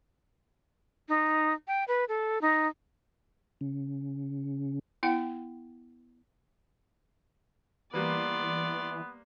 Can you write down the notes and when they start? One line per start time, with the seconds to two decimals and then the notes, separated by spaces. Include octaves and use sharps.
1.09 D#4
1.68 G5
1.88 B4
2.09 A4
2.41 D#4
3.61 C#3
5.03 B3 E4 F#5 G5
7.94 E3 G3 A#3 B3 B4 D5 C6